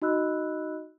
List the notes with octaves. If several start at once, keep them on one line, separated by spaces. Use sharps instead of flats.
D#4 F#4 D#5 B5 E6 F#6